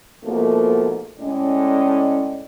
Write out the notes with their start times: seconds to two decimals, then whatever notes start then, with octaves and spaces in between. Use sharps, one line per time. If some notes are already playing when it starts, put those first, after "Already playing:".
0.24 G#2 B2 F3 A3 A#3
1.19 A2 G#3 C#4 D5 D#5